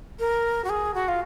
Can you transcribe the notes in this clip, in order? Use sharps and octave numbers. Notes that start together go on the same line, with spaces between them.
A#4
F#4
G#4
F#4
F4